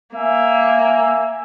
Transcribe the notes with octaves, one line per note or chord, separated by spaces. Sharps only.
A#3 E5 G#5